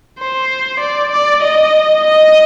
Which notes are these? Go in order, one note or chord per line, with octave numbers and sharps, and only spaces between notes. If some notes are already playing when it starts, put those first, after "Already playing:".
C5
D5
D5
D#5
D#5